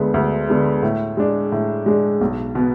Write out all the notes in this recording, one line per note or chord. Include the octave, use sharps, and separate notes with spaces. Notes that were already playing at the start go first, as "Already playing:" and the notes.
Already playing: D2 D3 G#3 B3
D2
D3 G#3 B3
A2
G#3 D4
A2
G#3 D4
B1
B2 B3